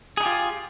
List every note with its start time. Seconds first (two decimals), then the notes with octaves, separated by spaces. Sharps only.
0.17 G#4
0.20 D#4
0.23 G4
0.26 F4